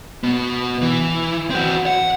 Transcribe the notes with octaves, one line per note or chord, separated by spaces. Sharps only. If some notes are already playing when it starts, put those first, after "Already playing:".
B2 B3
E3
C4 F#4
F#5